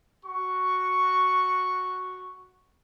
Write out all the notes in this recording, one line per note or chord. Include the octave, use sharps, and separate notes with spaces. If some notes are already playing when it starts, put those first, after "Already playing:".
F#4 C#6